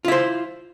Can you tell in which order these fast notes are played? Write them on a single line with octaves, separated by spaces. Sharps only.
F4 E4 C5